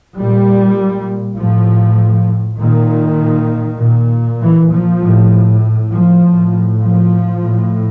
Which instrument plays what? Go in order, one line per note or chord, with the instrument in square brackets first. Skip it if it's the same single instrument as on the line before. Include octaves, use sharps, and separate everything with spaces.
[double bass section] A#2 G3
A2 F3
A#2 D#3
A#2
E3
F3
A2
F3
A2
F3
A2